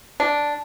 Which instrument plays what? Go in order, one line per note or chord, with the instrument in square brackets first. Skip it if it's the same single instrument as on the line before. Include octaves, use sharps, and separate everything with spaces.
[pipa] D4